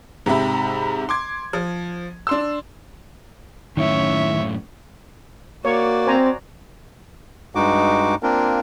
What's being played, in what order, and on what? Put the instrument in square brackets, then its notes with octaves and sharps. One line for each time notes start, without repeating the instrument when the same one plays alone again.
[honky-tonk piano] G#2 C3 G4 E5 B5
C6 D6 G#6
F3
D4 C6 E6
[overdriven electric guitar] F#2 A2 [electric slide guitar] D#3 C#4 E4 [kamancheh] C#5 E5
[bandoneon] A#3 [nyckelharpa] F#4 D5 [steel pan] C#5
[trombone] C4 [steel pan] C5 G#5 A#5
[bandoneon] G2 G#3 D#4 F#4 D6
A#3 C4 D4 F4 A#4